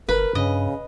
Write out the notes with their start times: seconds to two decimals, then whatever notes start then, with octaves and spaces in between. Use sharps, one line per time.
0.09 G1 A#4 B4
0.35 G2 C#3 D#5